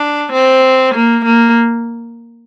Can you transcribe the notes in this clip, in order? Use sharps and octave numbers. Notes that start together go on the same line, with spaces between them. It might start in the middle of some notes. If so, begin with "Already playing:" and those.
Already playing: D4
C4
A#3
A#3